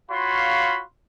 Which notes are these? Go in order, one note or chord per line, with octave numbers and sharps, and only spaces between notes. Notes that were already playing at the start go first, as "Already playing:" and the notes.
F4 F#4 C#5 F5 B5 C6